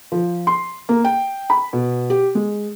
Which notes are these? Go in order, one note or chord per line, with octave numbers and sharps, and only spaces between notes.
F3
C6
A#3
G5
B5
B2
G4
G#3